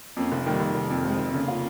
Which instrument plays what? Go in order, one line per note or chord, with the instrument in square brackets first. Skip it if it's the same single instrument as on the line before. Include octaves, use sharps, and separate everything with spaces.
[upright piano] F2 [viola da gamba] A#3 C#4
[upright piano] F1
[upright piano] D#3 [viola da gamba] G3 A#3
[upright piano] F1
F1
F2
[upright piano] F1 [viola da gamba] G#3 C4
[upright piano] F1
[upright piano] C#3 [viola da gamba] A#3 C#4
[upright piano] F4